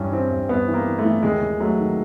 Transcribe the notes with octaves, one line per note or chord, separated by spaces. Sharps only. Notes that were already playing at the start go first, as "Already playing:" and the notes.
Already playing: G2 E3 C#4
E3 C4
G2
G2 B3
E3
A#3
E3
A3
E3
D#2 G#3
D#2
F#3 A3
D#3